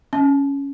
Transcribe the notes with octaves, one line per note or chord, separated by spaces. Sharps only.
C#4